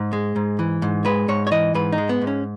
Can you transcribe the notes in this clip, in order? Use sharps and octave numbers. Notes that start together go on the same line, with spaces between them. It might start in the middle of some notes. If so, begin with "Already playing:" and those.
Already playing: G#2
G#3
G#2
E3
G#2
G#3 B4
G#2 C#5
C#5
E3 D#5
G#2 B4
D#4
G#3
B3
G#2
C#4